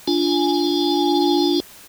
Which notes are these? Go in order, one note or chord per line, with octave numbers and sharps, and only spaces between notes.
D4 F4 G#5